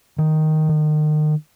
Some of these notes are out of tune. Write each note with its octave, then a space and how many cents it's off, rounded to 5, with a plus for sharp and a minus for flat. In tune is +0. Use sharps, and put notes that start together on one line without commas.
D#3 +0
D#3 -30